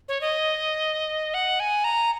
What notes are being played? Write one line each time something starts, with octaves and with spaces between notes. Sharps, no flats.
C#5
D#5
F#5
G#5
A#5